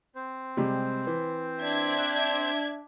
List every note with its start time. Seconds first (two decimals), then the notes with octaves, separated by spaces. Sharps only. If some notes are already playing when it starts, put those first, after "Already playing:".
0.15 C4 C5
0.57 C3 G3 G#3
1.07 E3
1.62 D4 E5 G#6
1.98 F#6